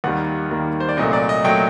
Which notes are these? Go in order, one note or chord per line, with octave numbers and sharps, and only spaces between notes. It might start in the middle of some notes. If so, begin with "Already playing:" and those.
D#2 D#3 G3 A#3 F#5
D#2 D#3 G3 A#3
C5
D5
C2 A#2 F#3 A3 D#5
D5
D#5
A#2 F#3 A3 G5